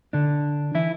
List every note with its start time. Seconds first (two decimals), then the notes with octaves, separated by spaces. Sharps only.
0.13 D3 D4
0.75 E3 E4